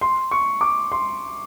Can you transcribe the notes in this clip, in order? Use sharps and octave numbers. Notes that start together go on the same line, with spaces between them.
C6
C#6
D6
C6